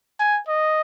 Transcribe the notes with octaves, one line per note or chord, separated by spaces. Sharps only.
G#5
D#5